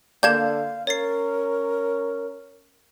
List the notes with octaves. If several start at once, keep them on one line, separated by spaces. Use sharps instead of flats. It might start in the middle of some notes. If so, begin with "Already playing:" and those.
D3 A#3 D4 F5 G6 G#6 E7
C#4 A#4 C#5 A6 C7